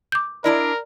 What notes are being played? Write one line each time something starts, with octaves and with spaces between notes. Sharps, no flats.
D6 G6
D4 E4 A#4 D5 D#5